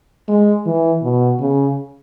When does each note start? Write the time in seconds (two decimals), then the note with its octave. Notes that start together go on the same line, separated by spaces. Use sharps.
0.28 G#3
0.66 E3
1.03 B2
1.41 C#3